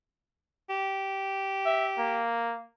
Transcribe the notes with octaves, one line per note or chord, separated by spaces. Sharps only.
G4
E5
A#3